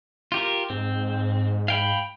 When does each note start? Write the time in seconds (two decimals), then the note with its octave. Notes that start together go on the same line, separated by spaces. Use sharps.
0.32 F4 G4 A#4
0.70 G#2 C4
1.68 F5 G5 B5